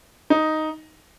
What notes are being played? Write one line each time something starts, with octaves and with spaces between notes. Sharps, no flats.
D#4